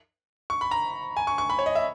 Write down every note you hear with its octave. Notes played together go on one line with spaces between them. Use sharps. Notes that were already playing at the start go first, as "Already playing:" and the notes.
C#6
B5
A#5
G#5
C#6
C#6
B5
C#5
D#5
E5